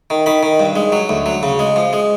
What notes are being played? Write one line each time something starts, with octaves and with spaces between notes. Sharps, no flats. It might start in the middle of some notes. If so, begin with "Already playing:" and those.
D#3
D#3 B5
D#3
G2
G#3
F#3
D2
F#3
C#3
G#3
F3
G#3